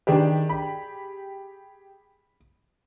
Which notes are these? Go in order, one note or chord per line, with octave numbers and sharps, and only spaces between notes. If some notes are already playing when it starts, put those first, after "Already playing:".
D#3 D4 G4 G#4 B4
B5